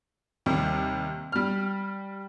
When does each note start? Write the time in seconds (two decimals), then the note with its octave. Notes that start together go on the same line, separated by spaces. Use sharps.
0.46 D#2 C3 G3
1.32 G3 F6